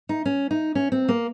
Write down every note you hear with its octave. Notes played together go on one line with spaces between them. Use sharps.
D#4
C#4
D#4
C#4
C4
A#3